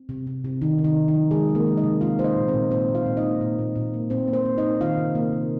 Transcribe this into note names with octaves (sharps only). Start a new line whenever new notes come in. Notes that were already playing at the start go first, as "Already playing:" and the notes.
Already playing: C4
C3
C3
C3
C3 D#3 D#4
C3
D#3 D#4
C3
D#3 D#4
F3
C3 G#3 G#4
F3
A#3 A#4
G#3
D#4 D#5
C3
A#3 F4 F5
A#3 C5
D#4 D#5
A#2
C4 C5
A#2
A#2 C4 C5
A#2
F4 F5
A#2
D#4 D#5
A#3
A#2
A#2
A#2
A#3
A#2 C4 C5
A#3
C4 C5
A#3
A#3 D#4 D#5
D#3 F4 F5
C3
A#3
C3